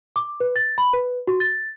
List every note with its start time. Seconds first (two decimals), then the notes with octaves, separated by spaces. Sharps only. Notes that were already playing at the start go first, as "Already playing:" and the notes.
0.16 D6
0.40 B4
0.56 A6
0.78 B5
0.93 B4
1.27 F#4
1.40 A6